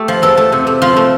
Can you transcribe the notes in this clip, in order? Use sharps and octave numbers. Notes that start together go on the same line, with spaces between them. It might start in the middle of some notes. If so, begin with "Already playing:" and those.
Already playing: A3 G4
F3
E2 A4
A3
C3
A3
F3 F4
A3